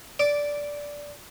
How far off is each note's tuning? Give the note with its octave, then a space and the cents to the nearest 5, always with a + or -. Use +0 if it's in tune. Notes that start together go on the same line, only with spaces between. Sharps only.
D5 -10 D6 +0